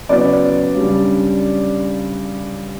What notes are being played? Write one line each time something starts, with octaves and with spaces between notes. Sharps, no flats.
C#3 F#3 B3 D5
C#3 G3 D4